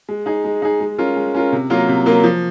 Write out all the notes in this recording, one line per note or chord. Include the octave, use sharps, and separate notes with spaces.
G#3
D#4 G#4
G#3
D#4 G#4
G#3
C#4 F4 A#4
G#3
C#4 F4 A#4
C3
F#3 A#3 F4 A#4
C3
F#3 A#3 F4 A#4
F3